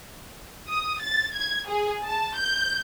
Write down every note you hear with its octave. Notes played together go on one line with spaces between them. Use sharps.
D#6
A6
G#6
G#4
A5
G6